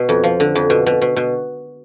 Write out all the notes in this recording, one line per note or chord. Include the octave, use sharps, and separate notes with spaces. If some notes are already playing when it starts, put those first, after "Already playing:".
Already playing: B2
F2
F3
D3
F2
B2
B2
B2
B2